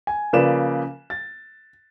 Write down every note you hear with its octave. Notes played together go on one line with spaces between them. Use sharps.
G#5
C#3 F3 A#3 B4 D5 E7
A6